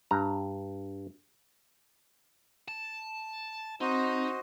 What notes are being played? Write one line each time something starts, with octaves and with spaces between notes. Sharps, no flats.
G2 A#5
A5
C4 D#4 F#4 C5 D#5